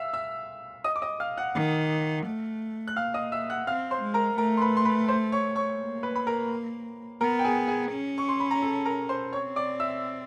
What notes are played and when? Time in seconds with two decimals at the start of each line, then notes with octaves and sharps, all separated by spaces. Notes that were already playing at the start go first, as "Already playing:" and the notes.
Already playing: E5 F5 E6
0.13 E5 E6
0.84 D#5 D#6
0.96 D6
1.02 D#5 D#6
1.20 F5 F6
1.37 F#5 F#6
1.55 D#3
2.26 A3
2.88 F#6
2.96 A#3 F5 F6
3.14 D#5 D#6
3.32 E5 E6
3.50 F#5 F#6
3.67 C4 F5 F6
3.91 C5 C6
4.02 G#3
4.14 A#4 A#5
4.38 A3 A#4 A#5
4.57 C6
4.61 B4 B5
4.77 C6
4.85 B4 B5
5.08 C5 C6
5.32 C#5 C#6
5.55 C#5 C#6
5.79 A#3
6.03 B4 B5
6.16 B5
6.27 A#4 A#5
7.21 B3 A#4 A#5
7.39 G5
7.44 G#4 G#5
7.68 G#4 G#5
7.92 C#4
8.18 C#6
8.29 C6
8.40 B5
8.51 A#5
8.62 A4 A5
8.86 A#4 A#5
9.09 C5 C6
9.33 C4 C#5 C#6
9.56 D5 D6
9.80 E5 E6